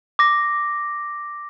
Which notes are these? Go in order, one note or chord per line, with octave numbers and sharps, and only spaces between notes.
D6 A#6